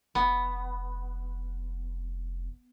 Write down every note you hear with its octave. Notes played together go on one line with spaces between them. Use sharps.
F1 B3